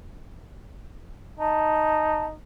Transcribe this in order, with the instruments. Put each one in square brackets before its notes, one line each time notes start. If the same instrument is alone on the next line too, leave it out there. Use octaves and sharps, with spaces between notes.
[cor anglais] D#4 [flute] A5